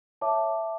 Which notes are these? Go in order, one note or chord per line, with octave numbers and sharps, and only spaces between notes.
C#5 E5 A5 D6